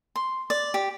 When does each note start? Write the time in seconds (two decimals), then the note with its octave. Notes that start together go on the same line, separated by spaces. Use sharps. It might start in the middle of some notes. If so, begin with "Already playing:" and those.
0.16 C6
0.50 D5
0.74 G4